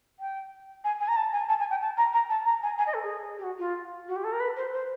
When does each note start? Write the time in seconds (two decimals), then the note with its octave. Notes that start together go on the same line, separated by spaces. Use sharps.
0.20 G5
0.84 G#5
1.00 G#5
1.08 A#5
1.16 A5
1.33 G#5
1.49 A5
1.59 G#5
1.70 G5
1.82 A5
1.97 A#5
2.13 A#5
2.29 A5
2.45 A#5
2.63 G#5
2.78 G#5
2.87 D#5
2.94 A4
3.03 G#4
3.39 G4
3.43 F#4
3.59 F4
4.08 F#4
4.16 G4
4.24 A4
4.32 A#4
4.40 B4
4.56 C5
4.73 C5